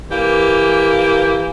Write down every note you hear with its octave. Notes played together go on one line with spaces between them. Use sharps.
E3 A#3 G4